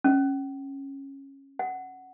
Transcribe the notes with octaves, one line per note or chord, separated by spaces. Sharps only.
C#4
F#5